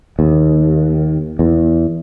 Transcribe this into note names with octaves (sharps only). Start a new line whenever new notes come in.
D#2
E2